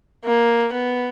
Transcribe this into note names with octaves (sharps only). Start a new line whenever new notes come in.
A#3
B3